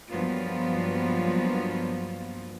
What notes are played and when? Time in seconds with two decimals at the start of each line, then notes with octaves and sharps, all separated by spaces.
0.11 G2 F3 F#3 A#3 B3 F4